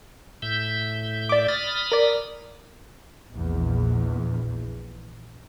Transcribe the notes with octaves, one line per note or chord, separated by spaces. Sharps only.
A2 E5 G6
D5 D6
B5 D#6 F6 A6
A#4 D5
A#1 E2